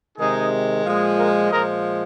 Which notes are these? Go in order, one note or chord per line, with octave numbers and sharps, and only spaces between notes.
C3 D#3 G#3 D#4 G#4
A#2 F3 G#3
F4 A#4
A#2 F3 G#3 A#4 D#5